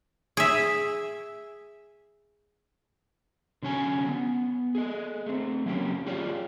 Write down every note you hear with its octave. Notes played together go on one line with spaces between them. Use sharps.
G#4 E5
D3 F#3 C#4 D4 G#5
B3
G#4 A4 D#5
A3 C4
F#3 A#3 C#4 G4
F4 G4 G#4 C#5 D5 F5